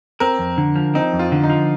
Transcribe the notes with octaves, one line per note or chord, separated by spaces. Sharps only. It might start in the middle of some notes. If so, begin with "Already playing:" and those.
C4 A#4
F2
D3
F3
C4 D#4
F2
F4
D3
D#4
F3